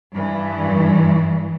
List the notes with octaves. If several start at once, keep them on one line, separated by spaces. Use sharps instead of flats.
G2 E3